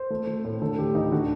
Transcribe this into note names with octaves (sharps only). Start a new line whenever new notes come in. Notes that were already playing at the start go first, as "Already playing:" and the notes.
Already playing: C5
A3
A3
A2
D3 A4
D2 G4
D2 D#4
D3 F#4